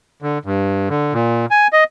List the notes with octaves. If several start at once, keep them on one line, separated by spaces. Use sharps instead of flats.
D3
G2
D3
A#2
G#5
D#5